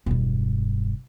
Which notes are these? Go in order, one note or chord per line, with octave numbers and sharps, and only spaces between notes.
E1 G2